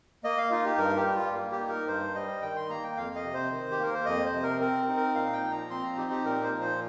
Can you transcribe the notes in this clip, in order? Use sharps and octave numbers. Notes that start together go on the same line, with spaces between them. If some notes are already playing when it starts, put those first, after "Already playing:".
A#3 D#5
F5
D#4 F4
G4
G2 A#4
G4
G3
F4
A#3
G4
D#4
A#4
G2 C5
G3 D#5
D#3 G5
C6
A#3 A#5
G5
F2 F5
D#5
C3
C5
D#3
G4
A#3 A#4
C5
F2 D#5
C5
C3
A#4
C4 A#4
D#4
A#4
A#2 F5
G5
F3
A#5
C4 C6
A#5
D#4 G4
G4
A#2 A#4
C5
F3
C5